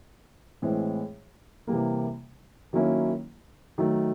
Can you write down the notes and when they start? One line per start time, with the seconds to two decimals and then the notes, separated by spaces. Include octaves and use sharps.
0.62 A2 E3 G#3 C4
1.67 C3 E3 G3 A#3
2.73 D#3 F#3 A#3 C#4 E4
3.78 D#3 F#3 A3